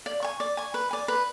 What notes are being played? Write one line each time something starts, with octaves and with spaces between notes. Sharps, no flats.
D5
G#5 C#6
D5
G#5 C#6
B4
D5 G#5
B4